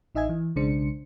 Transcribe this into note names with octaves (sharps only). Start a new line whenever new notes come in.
A1 D#4 D#5 E5 G#5 G#6
E3
B1 C#3 G#3 D4 C5 C#7